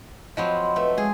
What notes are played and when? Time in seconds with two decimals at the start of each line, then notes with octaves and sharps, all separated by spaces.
0.37 F3 F#3 C4 D#5 B5
0.76 A3 B4 D#5
0.98 G#3 G#4